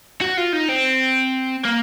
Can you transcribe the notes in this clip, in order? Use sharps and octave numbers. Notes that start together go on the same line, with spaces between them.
F#4
F4
D#4
C4
A#3